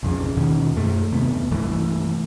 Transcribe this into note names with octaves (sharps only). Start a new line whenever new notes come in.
B1 F2 C#3
D#2 B2 D#3 C#4
F#2 A3
D#2 C3 B3
C2 G2 E3 A3